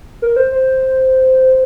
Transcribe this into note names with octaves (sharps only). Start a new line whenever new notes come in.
A#4
C5
C5